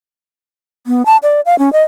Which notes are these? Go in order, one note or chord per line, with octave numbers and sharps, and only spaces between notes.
B3
A5
D5
F5
C#4
D#5